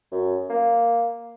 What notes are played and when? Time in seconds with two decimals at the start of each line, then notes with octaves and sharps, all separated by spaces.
0.12 F#2
0.50 A#3